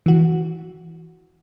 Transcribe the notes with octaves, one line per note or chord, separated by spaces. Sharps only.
E3 F#4